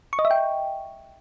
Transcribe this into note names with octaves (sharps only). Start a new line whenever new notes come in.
C#6
D#5
E5
G5